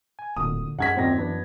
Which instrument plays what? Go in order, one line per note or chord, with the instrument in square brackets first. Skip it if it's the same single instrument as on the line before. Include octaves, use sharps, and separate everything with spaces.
[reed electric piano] G#5
[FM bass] D1 [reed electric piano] A#2 D3 [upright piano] D#6
[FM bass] F#2 [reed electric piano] D#4 G#4 [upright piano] F#5 G#6 B6
[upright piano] D#1 A#6 [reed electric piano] C4 D#4 D5
[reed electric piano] E3 D4 [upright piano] B3